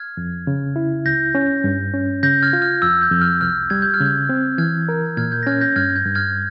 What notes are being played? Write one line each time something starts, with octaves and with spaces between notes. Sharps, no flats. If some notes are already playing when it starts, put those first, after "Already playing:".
Already playing: F6 G#6
F2
C#3
E4
C#2 G6 A#6
C#4
G2
C#4
C#3 G6 A#6
F6 G#6
F4
F6
F2 E6
G6
F2
F6
C2 F6
G3 G#6
G6
F6
C#3
G6
C4
E3 F6 G#6
A#4
A#2 F6 G#6
G6
A#6
C#4 F6 G#6
G6 A#6
G2 F6 G#6
G6
G2
F6 G#6